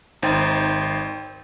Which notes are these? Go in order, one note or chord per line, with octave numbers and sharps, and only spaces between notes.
G#1 D#4 C5 G5 C6 A6